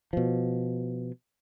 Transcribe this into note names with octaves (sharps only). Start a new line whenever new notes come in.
B2 F3